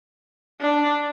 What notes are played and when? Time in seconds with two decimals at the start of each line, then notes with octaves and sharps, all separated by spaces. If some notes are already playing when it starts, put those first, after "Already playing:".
0.61 D4